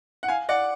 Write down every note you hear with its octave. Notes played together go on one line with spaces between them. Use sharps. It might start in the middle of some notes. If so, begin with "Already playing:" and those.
F#5
F5 G#5
D5 F#5